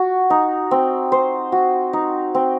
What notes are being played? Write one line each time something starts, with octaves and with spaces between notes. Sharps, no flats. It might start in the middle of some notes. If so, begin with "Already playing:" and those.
Already playing: F#4
D#4
C4
C5
F#4
D#4
C4